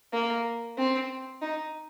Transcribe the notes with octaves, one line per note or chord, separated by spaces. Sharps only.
A#3
C4
D#4